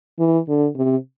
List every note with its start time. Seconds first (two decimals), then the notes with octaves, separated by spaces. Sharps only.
0.19 E3
0.48 D3
0.76 C3